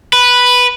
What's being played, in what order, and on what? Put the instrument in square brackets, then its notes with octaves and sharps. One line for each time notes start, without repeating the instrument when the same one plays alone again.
[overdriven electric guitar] B4